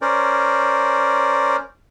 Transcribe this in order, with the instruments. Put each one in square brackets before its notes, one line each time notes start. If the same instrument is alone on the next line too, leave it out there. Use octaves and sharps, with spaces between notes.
[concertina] C#4 A#4 C5 D5